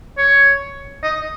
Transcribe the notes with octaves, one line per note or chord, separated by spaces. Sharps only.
C#5
D#5